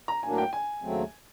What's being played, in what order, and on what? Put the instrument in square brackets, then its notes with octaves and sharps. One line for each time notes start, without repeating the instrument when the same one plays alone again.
[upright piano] A#5
[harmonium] A2 F#3 A#3 D4 [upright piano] G#5
[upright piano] G5
G#5
[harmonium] D#2 C#3 F#3 A3 C4